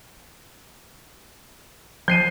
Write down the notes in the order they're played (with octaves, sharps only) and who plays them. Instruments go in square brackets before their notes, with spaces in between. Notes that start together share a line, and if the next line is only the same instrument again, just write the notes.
[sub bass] F3 [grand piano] G6 C7 D#7